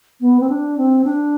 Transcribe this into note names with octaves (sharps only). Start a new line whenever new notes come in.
B3
C4
D4
C4
D4